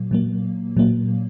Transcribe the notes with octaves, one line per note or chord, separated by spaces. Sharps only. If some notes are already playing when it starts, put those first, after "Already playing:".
Already playing: A#2 F#3 A#3
A#2 F#3 A#3
A#2 F#3 A#3